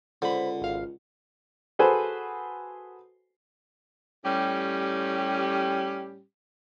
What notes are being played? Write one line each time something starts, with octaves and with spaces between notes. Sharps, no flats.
C#2 D3 C5 B5
G#1 F5
F#4 G#4 A4 B4 C5 G#5
A2 G3 C#4 G4